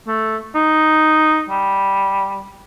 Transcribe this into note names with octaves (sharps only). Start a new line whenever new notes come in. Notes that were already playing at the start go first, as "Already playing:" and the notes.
A3
D#4
G3